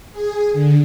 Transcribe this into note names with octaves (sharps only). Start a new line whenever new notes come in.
G#4
D3